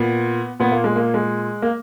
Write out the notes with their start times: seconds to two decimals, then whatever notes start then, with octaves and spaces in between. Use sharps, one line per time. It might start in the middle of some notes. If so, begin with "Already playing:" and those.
Already playing: A#2 B3
0.60 A#2 B3
0.72 A#3
0.84 G#3
0.96 A#3
1.14 G#3
1.62 A#3